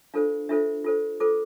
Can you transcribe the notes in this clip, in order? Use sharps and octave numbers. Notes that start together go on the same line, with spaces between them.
D4 F4 A4 C5 F5
D4 F4 A4 C5 E5
F4 A4 C5
F4 A4 C5 D6